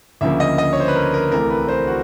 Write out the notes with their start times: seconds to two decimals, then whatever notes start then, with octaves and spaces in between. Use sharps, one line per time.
0.21 D2 C#3 F3 A#3 E5
0.40 D#5
0.58 D#5
0.73 C#5
0.80 C5
0.88 B4
0.95 A#4
1.14 A#4
1.32 C2 C3 E3 A3 A#4
1.50 B4
1.68 C5
1.87 F#4